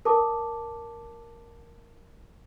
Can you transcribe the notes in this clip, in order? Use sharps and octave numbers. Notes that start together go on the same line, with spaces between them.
A#4 A5 D6